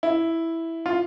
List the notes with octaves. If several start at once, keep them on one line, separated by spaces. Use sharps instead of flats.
E4
F4